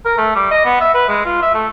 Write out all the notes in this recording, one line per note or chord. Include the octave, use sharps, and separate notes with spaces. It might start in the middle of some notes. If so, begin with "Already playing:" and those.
A#4
A3
G3
D#5
B3
E5
B4
G#3
F4
E5
A3